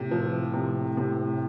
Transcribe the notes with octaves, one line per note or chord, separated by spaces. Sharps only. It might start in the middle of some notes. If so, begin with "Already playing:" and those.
Already playing: A2 C3
F3
C3
C3